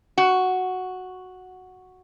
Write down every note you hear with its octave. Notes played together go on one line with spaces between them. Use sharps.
F#4